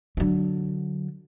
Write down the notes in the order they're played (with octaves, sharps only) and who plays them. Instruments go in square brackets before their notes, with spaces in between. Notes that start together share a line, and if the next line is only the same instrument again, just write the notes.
[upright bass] D3 F#3